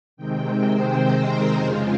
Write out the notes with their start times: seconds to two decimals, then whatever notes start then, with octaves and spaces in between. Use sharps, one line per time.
0.17 C3 D#3 G#3 C4 G5
0.51 C5
1.20 A#4
1.55 F2 C#3 G#3 F4